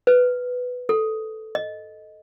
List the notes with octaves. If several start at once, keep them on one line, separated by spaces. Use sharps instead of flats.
B4
A4
D#5